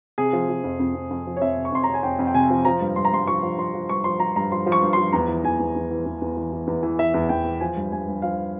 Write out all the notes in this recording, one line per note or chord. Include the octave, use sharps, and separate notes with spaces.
C3 G#4
F3
F3
F2
F2
F2
F2
F3
C#5
F2 E5
C3
C#6
F2 C6
A#5
C3
G#5
F2 G5
F2
G5
C3 G#5
F3
F3 A#5
G2
G2 C6
A#5
G2 C6
F3 C#6
F3
F3 C6
F3
G2 C#6
F3 C6
F3 A#5
G2 A#5
F3 C6
F3
C#6
G2
C6
F3
E2 A#5
E3
E2 G#5
E2
E2
E3
E2
E2
E3
E3
E2
E3
E3 E5
E2
E2 G5
E3
F3 G#5
G2
G2 G#5
G2
F3 F5